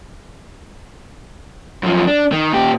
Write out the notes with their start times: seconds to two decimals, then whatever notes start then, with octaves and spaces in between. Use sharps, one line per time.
1.83 F#2 F3
2.07 D4
2.32 D#3
2.53 A#2 G4